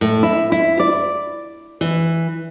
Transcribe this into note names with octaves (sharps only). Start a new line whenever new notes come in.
A2
E4
E4
D5
E3